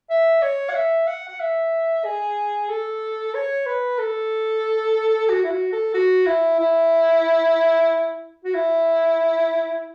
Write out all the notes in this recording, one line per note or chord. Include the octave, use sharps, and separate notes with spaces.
E5
C#5
F#5
E5
F#5
F#5
E5
G#4
A4
C#5
B4
A4
F#4
E4
F#4
A4
F#4
E4
E4
F#4
E4